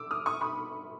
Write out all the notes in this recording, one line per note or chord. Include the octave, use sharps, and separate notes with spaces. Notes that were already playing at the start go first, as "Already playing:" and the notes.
Already playing: D6 E6
D#6 F6
C#6 D#6
B5 C#6